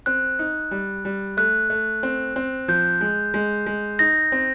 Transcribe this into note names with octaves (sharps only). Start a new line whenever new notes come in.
C4 F#6
D#4
G3
G3
A3 F#6
A3
C4
C4
F3 G6
G#3
G#3
G#3
D#4 A#6
C4